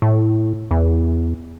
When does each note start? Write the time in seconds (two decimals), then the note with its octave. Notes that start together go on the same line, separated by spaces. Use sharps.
0.02 A2
0.71 E2